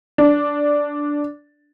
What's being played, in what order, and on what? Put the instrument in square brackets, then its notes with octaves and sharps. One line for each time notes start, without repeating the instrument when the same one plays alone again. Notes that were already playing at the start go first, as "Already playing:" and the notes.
[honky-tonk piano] D4